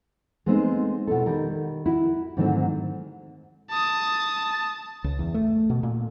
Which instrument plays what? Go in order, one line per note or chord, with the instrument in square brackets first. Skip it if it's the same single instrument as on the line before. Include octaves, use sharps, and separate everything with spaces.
[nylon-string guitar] G#3 A3 B3 C4 D#4
B2 E4 A4
D#3 G3 A#4
E4 F#4
G#2 D3 D#3 F#3 A3 C4
[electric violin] A5 D#6
[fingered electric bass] C#2
E2
A3
B2
A#2